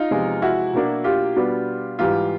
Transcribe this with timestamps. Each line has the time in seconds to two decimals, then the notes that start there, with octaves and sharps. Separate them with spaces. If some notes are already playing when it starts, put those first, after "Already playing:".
Already playing: D#4 F4
0.11 E2 C3 F3 G#3
0.42 E4 F#4
0.73 B2 F#3 A#3 D4
1.04 F4 G4
1.36 B2 G3 B3 D4
1.99 G#2 E3 G3 F4 G4